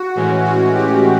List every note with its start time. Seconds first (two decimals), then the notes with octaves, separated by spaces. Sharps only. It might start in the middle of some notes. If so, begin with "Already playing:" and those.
Already playing: F#4
0.15 A2 E3 G#3 C#4
0.45 F#4
0.74 G4